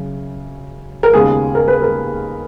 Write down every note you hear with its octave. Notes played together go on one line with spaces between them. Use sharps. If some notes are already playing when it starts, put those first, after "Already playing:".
Already playing: F#2 C#3
A#4
D#2 C#3 G#3 B3 G#4
A#4
B4
A#4